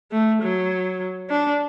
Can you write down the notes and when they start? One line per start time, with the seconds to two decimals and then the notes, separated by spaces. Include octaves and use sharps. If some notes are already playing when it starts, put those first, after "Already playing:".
0.12 A3
0.41 F#3
1.29 D4